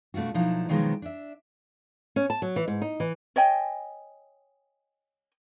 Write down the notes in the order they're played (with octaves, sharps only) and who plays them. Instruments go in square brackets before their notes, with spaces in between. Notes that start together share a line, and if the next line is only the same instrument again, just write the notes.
[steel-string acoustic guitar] B2 A3 D4 F4 F#4
B2 F3 F#3 D#4 E4
B2 D#3 F3 F#3 G#3 B3
D4 E5
[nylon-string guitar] C#4
A5
F#3
E3
G#2
D#4
E3
[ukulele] C#5 D#5 G5 G#5